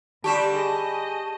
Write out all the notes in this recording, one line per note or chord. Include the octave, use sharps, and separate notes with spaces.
D3 G3 D4 G4 A5 C#6 E7
G#4 D#5